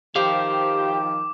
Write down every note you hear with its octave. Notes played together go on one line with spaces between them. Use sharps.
D#3 F3 G4 C5 F5 D6